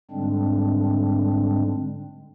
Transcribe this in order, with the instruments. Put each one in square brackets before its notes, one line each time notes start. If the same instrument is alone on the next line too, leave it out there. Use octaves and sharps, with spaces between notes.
[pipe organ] G#2 D3 G3 G#3 C4 D4